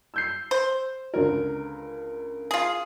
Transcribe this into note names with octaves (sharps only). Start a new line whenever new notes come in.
E6 G6 C7
C5
C#2 D3 A#4
F4 G#4